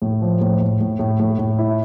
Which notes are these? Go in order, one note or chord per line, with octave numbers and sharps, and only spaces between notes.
A2
F3
A2
A2
A2
A2
A2
A2
E4